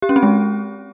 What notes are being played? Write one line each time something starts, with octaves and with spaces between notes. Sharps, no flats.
G4
C#4
C4
G#3